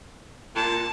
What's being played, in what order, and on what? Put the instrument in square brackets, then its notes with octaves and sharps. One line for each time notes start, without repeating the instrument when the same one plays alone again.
[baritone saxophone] A#2 [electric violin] A5